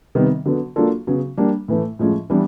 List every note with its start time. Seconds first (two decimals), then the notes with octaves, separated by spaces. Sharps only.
0.15 C3 D#3 G3 B3
0.45 D3 F#3 B3
0.76 F#3 A#3 D4 F4 A4
1.07 C#3 F#3 B3
1.37 G3 A#3 D4
1.68 A2 E3 A3
1.99 A2 F3 G#3 C#4
2.30 E3 G3 B3 D4